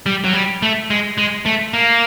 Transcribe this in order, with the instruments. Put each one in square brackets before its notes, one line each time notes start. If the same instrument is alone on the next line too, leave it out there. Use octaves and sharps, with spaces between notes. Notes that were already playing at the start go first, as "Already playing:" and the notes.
[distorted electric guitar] G3
F#3
G3
A3
G#3
G#3
A3
A#3